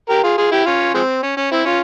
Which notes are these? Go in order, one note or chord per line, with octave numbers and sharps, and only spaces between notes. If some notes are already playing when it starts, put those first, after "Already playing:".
G4 A#4
F4 G#4
F4 G#4
E4 G4
C#4 F4
F3 G#3 C4
C#4
C#4
C4 E4
C#4 F4